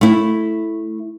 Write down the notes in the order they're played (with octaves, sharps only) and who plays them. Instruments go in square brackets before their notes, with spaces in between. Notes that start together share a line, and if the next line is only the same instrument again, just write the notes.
[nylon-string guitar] A3 E4